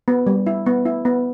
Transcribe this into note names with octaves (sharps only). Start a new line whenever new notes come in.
B3
G3
E4
B3
E4
B3